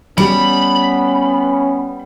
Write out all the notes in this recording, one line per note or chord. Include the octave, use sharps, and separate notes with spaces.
G3 B3 C#4 B5